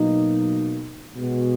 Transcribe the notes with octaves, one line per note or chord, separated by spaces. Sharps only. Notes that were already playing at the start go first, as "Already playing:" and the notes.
Already playing: B2 F#3 A#3 D#4
B2 G#3 B3 F#4